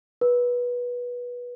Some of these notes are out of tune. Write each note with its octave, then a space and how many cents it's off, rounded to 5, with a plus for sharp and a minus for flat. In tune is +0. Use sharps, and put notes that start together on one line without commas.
B4 -20